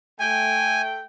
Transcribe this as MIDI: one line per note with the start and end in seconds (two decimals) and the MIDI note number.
0.20 1.03 57
0.20 1.03 79
0.20 0.82 80